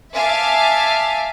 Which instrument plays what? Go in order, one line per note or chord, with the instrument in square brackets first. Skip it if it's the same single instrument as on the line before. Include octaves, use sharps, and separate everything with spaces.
[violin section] E5 F5 G#5 A5 D6